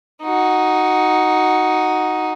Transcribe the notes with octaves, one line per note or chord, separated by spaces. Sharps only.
D#4 F#4